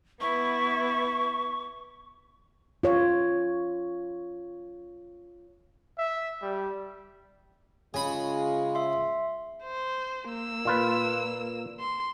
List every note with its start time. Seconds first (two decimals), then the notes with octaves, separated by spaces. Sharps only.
0.21 B3 E4 C#6
2.83 F4 C#5
5.98 E5
6.42 G3
7.94 C#3 G#3 C#4 F4 G#5 B5
8.75 E5 C6
9.63 C5
10.30 A#3 E6
10.65 A#2 F4 B4
11.80 C6